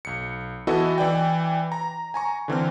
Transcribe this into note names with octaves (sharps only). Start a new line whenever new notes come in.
B1 C#7
E3 B3 E4 F#4 A4 D#5
E3 D5 G5
A#5
G#5 A#5 C#6
D3 E3 C4 F6